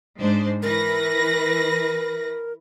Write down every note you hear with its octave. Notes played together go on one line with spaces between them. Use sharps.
G#2 D4 C5
E3 A#4 B4 A#6